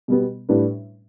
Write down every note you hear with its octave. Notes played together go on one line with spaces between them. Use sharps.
B2 G3 B3
A2 G3 D4 B4